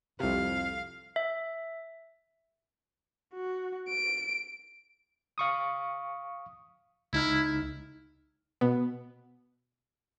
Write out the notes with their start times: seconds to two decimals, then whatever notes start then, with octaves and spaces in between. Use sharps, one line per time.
0.20 C2 F2 C3 F5
1.16 E5
3.34 F#4
3.89 D7
5.38 F5 C#6 D#6
7.13 C#2 D#4 E4 F6
8.61 B2 B3